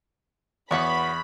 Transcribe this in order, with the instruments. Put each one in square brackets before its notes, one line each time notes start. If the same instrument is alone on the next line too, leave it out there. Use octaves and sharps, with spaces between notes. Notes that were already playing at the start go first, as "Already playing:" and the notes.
[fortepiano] E2 [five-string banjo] F#3 B3 F#5 [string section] B5 [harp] C#6